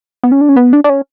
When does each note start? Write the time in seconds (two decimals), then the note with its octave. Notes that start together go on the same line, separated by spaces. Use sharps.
0.23 B3
0.32 C#4
0.41 D4
0.49 C#4
0.56 B3
0.73 D4
0.84 D4
0.89 C#4